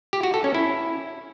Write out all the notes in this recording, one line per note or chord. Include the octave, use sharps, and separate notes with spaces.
G4
F#4
A4
C#4
E4